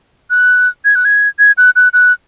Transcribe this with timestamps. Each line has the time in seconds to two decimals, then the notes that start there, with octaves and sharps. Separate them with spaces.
0.30 F#6
0.85 G#6
0.95 F#6
1.05 G#6
1.39 G#6
1.58 F#6
1.76 F#6
1.93 F#6